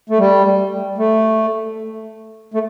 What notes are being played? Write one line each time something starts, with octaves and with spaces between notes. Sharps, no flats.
A3
G3
A3
A3